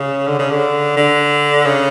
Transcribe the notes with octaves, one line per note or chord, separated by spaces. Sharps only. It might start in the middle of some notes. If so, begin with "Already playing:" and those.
Already playing: C#3
D3
C#3
D3
D3
C#3